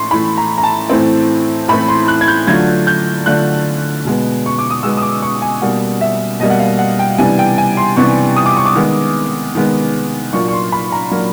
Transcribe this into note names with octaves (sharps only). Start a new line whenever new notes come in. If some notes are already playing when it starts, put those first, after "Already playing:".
Already playing: A2 E3 A3 C6 C#6
A2 E3 A3 B5
A#5
A#5
A5
A2 E3 A3 C4
A2 E3 A3 C4 B5
C6
F#6
G#6
G6
D3 F#3 A3 D4 F4 G#6
G6
D3 F#3 A3 D4 F4 F#6
B2 G#3 B3
C#6
D6
D#6
B2 G#3 B3 E6
D#6
D6
C#6
G#5
B2 G3 A#3 F#5
E5
B2 G3 A#3 D#5
F#5
F5
F#5
G5
C3 E3 G3 B3 D4 G#5
G5
G#5
C6
C3 E3 G3 B3 D4 C#6
D#6
D6
C#6
D6
D#3 G#3 B3
D#3 G#3 B3
A#2 F#3 A#3 D4 F4 C#6
C#6
C6
B5
A#5
A#2 F#3 A#3 D4 F4